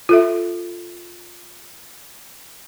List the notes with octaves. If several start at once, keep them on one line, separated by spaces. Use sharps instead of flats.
F4 A4 E5